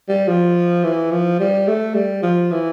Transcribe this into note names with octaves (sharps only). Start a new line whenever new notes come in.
G3
F3
E3
F3
G3
A3
G3
F3
E3